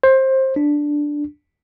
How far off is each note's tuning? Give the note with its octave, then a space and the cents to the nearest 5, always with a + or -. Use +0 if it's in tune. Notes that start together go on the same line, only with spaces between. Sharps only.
C5 +20
D4 +0